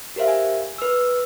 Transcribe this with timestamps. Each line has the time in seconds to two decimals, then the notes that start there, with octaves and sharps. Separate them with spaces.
0.16 G4 A#4 C5 E5 F5
0.28 G#5
0.78 B4 E6